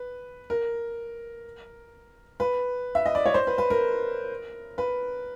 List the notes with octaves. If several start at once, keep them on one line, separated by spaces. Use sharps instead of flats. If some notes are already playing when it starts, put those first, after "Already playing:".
Already playing: B4
A#4
B4
E5
D#5
D5
C#5
C5
B4
B4
A#4
B4